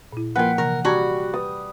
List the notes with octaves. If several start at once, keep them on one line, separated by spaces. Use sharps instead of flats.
A#2 E4
F3 A#3 F4 A#4 B4 F#5 G5
C3 E3 A#4
G3 F#4 A5 A#5 G#6
B4 D#6